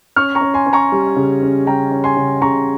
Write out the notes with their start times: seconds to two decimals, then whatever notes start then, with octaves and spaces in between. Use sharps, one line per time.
0.16 C#4 C#6 F6
0.35 A#5 C#6
0.41 C#4
0.54 G#5 C6
0.66 C#4
0.73 A#5 C#6
0.92 G3
1.16 C#3
1.42 C#4
1.67 G3 G5 A#5
1.91 C#4
2.04 G#5 C6
2.17 C#3
2.41 C#3 A#5 C#6